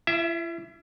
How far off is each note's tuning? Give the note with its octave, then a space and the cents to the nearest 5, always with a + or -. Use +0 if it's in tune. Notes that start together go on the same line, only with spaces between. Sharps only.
E4 +45 E5 +0